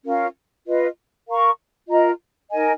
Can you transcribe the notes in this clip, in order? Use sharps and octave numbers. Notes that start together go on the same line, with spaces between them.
C#4 F4 A#4 F5
F4 B4 D#5
A#4 F5 A#5 C#6
F4 A#4 D#5 A#5
D#4 A#4 D#5 G#5